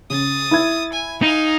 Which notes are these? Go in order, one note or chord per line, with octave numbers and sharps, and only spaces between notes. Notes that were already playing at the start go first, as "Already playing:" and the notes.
C#3 D#6 A6
E4 E5 G#6
G#5
D#4 F5 G#5